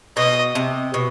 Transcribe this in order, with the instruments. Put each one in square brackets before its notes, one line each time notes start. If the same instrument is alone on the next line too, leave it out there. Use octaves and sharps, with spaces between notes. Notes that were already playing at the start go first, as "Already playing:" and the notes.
[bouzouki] B2 [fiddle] D#5
[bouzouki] C3
B2